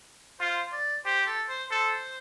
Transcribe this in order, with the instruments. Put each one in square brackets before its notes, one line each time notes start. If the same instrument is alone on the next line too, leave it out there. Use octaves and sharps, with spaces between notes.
[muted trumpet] F4 [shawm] C5
[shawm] D5
[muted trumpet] G4 [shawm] C5
[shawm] A4
C5
[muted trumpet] A4 [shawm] C5